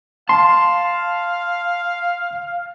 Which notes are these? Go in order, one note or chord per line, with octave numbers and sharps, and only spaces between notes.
F5 A5 C6